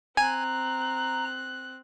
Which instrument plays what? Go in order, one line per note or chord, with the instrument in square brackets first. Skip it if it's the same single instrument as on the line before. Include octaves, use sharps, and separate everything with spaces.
[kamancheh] C4 F#6 [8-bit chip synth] G#5 [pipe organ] A#5